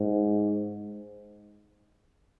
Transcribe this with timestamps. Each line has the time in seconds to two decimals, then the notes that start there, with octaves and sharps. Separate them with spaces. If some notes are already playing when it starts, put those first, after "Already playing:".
Already playing: G#2